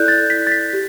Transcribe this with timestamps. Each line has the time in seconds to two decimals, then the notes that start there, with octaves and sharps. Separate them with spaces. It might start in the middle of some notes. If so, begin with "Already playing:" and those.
Already playing: E4 A4 D5 F#6 G6
0.08 A6
0.30 B6
0.47 A6
0.52 B6
0.73 G4